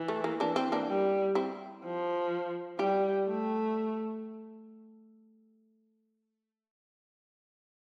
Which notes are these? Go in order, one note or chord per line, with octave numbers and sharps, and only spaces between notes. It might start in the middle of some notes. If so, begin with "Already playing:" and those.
Already playing: E3
A3
A#3
E3 A#3 D4
C4
A#3 D4
G3
C4 E4
F3
G3 E4 G4
A3